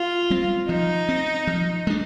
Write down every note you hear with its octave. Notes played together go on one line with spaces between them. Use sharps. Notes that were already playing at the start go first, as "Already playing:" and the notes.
Already playing: F4
G3 C4
F3 D#4
C4
F3
G#3 D4